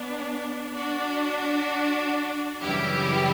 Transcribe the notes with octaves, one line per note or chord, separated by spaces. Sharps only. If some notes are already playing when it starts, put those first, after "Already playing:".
Already playing: B3 D4
D4 F#4
F#2 C#3 E3 G3 E4 G4